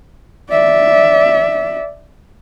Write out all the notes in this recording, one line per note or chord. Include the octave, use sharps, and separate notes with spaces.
D5 E5